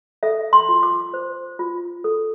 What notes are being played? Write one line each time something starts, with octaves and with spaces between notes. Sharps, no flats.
A4 E5
C6
F4
D6
C5
F4
A4